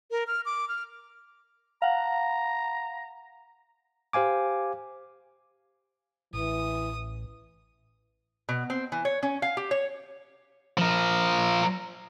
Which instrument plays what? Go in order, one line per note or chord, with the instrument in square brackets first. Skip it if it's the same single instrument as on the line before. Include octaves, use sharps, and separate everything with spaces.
[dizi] A#4
F6
D6
F6
[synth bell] F5 F#5 [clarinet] A#5
[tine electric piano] G4 C5 F5 G#5 D6
[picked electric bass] A1 [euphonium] E3 [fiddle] D#6
[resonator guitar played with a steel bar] B2
C4
E3
C#5
C#4
F5
G4
C#5
[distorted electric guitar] F3 A#4